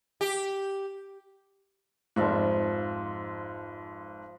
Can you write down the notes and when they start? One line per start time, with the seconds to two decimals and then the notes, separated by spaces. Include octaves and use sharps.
0.21 G4
2.16 F1 G#2 F3 E5 F5